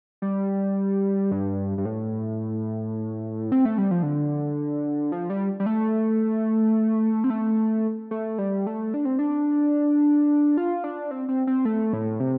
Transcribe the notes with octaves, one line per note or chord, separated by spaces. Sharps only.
G3
G2
G2
A2
C4
A3
G3
F3
D3
F3
G3
G3
A3
C4
A3
A3
G3
A3
D4
C4
D4
F4
D4
C4
C4
C4
A3
A2
C3